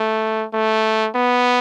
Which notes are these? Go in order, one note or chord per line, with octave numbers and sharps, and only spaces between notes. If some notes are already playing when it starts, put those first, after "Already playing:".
Already playing: A3
A3
B3